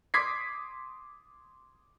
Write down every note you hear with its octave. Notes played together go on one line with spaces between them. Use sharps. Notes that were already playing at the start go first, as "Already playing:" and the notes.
C6 D6 D#6 G#6 B6 C7